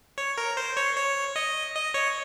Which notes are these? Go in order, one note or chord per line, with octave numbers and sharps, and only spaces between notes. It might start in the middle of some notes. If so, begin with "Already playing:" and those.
C#5
A#4
C5
C#5
C#5
D#5
D#5
C#5